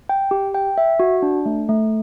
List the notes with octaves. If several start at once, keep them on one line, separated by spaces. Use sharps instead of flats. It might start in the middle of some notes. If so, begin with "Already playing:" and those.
G5
G4
G5
E5
F#4
D4
A3
A3